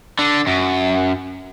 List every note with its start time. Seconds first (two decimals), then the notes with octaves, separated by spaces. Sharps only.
0.19 D3
0.47 F#2